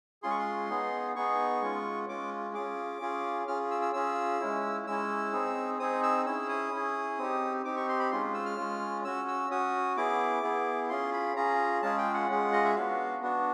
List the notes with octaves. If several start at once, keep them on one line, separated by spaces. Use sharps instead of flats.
G#3 C#4 F4 G#4 C6
C#6
C6
B3 D#4 G#4
B3 D#4 G#4 C#6
G#3 C#4 F4
G#3 C#4 F4 D6
C#4 F4 G#4 D6
C#4 F4 G#4
C#4 F4 G#4 F6
E6
E6
C#4 F4 G#4 E6
G#3 C#4 E4
G#3 C#4 E4 E6
C4 D#4 G#4
C4 D#4 G#4 D#6
E6
C#4 E4 G#4 E6
D#6
C#4 E4 G#4
C4 D#4 G4
C4 D#4 G4 D6
C#6
C6
B5
G#3 C#4 F4 C6
E6
F6
G#3 C#4 F4
C#4 F#4 E6
E6
C#4 F#4 D#6
B3 E4 G#4 D6
B3 E4 G#4
C#4 F4 G#4 C6
B5
C#4 F4 G#4 A#5
G#3 C#4 F4 G#4 A5
G5
F#5
G#3 C#4 F4 G#4
D#5
E5
B3 D4 F#4 F5
B3 D4 F#4